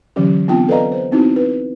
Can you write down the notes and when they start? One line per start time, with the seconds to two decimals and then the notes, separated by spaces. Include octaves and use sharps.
0.16 D3 E3 F#3 C#4 G4
0.48 B3 C4 D4 F4 G5 A5
0.68 A4 B4 D5 D#5 F5 A#5
0.92 C5
1.11 B3 C4 D#4 E4 F#4
1.36 B4